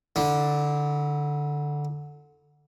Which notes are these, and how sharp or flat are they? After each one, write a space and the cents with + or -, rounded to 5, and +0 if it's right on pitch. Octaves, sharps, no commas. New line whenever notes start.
D3 +0 E4 -35